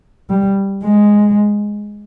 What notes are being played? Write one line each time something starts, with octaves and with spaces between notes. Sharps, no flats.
G3
G#3